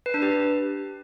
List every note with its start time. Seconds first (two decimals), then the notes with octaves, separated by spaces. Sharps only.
0.06 B4
0.14 D4
0.22 G4